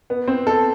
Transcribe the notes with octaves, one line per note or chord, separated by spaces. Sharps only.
B3
C4
A4